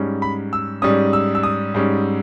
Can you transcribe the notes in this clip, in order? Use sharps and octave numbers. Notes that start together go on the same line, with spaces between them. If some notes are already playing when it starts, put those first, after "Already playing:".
Already playing: G#2 G3 C#4
B5
E6
G#2 G3 C#4 D#6
E6
E6
D#6
G#2 G3 C#4